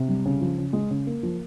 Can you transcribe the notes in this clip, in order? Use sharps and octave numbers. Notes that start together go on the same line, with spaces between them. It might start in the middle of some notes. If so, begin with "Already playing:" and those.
Already playing: C3
G3
C#3
F3
C#3
G#3
C#3
A#3
F3